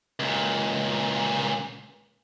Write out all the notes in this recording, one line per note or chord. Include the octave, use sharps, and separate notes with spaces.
C#2 A#2